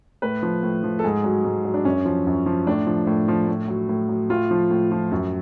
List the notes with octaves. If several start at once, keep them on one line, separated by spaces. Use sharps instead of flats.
A2 B4
F3
A2
F3
A4
G#2 G#4
F#3
G#2
F#3
D4
F#2 C#4
F3
F#2
F3
A2 D4
F3
A2
F3
A2
F#3
A2
F#3
A2 F4
F3
A2
F3
F#2